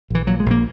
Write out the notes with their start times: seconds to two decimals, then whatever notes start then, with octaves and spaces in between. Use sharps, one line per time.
0.10 A#1 E3
0.27 A#2 F#3
0.40 G#3
0.46 A#1 A#3